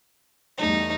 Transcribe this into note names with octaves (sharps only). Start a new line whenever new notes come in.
E2 G3 A3 D#4